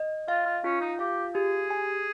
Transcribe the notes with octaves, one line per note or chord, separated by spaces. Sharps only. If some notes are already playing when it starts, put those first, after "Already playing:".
Already playing: D#5
F4 F5
F4
C#4 F4
D#4
G4 F5
G4 G#4
G#5